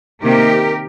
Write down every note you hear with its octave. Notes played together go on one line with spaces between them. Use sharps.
C3 D#3 A#3 G4 A#4